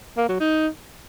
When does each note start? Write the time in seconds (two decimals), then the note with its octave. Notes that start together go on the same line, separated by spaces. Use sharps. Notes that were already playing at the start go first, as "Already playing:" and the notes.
0.17 A#3
0.29 F#3
0.40 D#4